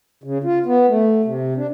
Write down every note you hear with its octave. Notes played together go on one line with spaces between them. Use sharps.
C#3
F4
B3
A3
C3
D4